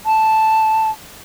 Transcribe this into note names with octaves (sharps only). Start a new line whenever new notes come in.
A5